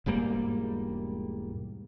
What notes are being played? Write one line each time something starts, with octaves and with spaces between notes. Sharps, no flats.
E1 G#2 G3 A#3